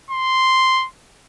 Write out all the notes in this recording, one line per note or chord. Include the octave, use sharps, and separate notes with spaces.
C6